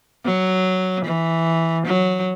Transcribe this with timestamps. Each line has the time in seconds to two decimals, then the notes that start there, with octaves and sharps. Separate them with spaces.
0.25 F#3
1.05 E3
1.87 F#3